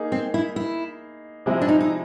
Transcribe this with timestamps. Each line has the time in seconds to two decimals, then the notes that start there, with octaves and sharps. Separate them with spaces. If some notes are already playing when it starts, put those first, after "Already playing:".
Already playing: A#3 D#4 G#4
0.12 C4
0.34 E4
0.56 E4
1.46 C3 F3 G#3 C4 E4
1.61 D4
1.68 D#4
1.81 D#4